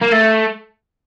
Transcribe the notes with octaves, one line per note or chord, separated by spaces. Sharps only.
A#3
A3